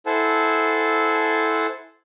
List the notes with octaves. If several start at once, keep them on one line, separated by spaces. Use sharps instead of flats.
E4 A4 C5 F#5 G#5 A5